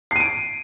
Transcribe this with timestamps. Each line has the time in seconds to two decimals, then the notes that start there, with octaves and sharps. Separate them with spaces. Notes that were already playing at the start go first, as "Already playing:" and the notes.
0.11 C7
0.16 D#7
0.20 D7